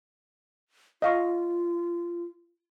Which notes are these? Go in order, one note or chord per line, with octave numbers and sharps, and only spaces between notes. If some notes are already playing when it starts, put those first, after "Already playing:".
F4 D#5 F5 C#6